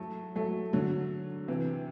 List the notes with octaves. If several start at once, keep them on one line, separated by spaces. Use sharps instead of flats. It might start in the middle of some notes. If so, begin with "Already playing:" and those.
Already playing: F#3 A3
F#3 A3
D3 F#3
C3 E3